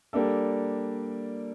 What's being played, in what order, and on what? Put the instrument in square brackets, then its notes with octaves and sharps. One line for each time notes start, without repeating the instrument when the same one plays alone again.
[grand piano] G3 A#3 D4 A4